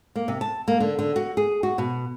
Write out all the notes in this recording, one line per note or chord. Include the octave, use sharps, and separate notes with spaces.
A#3
C3
A5
A#3
D3
D3
F#4
G#4
F#4
B2